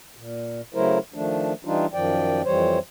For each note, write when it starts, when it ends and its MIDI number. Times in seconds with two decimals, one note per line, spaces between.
0.17 0.61 46
0.74 0.99 49
0.74 0.99 54
0.74 0.99 57
0.74 0.99 64
0.74 0.99 70
0.74 0.99 72
1.14 1.53 51
1.14 1.53 53
1.14 1.53 57
1.14 1.53 62
1.65 1.86 52
1.65 1.86 55
1.65 1.86 62
1.65 1.86 63
1.65 1.86 65
1.94 2.42 42
1.94 2.42 51
1.94 2.42 53
1.94 2.42 74
1.94 2.42 79
2.45 2.79 41
2.45 2.79 52
2.45 2.79 55
2.45 2.79 72
2.45 2.79 73